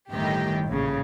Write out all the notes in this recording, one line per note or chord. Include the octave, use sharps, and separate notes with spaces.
G1 A2 D#3 G4
A#1 A2 C#3